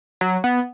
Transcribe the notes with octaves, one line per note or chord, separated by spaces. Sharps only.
F#3
B3